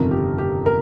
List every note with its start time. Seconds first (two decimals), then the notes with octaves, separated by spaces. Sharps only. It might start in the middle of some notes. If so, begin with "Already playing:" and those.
Already playing: G1 F2 C3 D#3 A#4
0.11 G4
0.38 G4
0.66 A#4